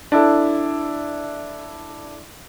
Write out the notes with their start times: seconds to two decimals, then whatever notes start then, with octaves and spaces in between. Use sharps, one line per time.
0.12 D4 E4 A4